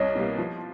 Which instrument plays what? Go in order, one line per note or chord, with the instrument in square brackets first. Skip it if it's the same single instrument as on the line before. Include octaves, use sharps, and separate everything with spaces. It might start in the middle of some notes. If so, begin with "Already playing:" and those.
Already playing: [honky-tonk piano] C2 [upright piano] C#5 D#5
[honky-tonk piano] B2 G3 A#3
F3